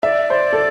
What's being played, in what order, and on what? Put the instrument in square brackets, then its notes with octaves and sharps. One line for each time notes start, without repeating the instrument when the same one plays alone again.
[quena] D5 [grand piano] E5
[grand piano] C5
A4